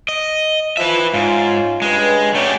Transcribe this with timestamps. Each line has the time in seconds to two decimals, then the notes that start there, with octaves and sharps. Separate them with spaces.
0.09 D#5
0.77 F3 B4 E5
1.14 G#2 C#4 F4
1.82 C#2 G2 G#3
2.35 F#3 A3 C#4 G4